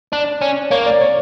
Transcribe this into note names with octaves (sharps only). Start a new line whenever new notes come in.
D4 D5
C#4
A#3 C#5
D5
C#5